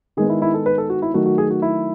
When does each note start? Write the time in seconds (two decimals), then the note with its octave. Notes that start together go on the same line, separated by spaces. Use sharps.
0.17 D#3 G#3 B3 G#4
0.29 E4
0.42 E4
0.54 A4
0.66 B4
0.78 A4
0.90 F#4
1.02 E4
1.14 D#3 F#3 A3 F#4
1.26 F#4
1.38 G#4
1.51 F#4
1.62 E4